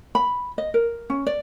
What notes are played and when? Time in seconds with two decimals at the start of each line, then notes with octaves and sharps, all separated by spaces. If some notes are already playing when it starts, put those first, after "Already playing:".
0.15 B5
0.58 D#5
0.74 A#4
1.10 C#4
1.26 D5